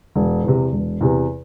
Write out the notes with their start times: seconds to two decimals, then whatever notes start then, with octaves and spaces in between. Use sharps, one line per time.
0.15 E1
0.44 E2 C3
0.72 E1
1.01 E2 C3